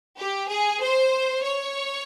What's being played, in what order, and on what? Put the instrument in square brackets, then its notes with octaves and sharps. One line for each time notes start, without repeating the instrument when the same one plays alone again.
[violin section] G4
G#4
C5
C#5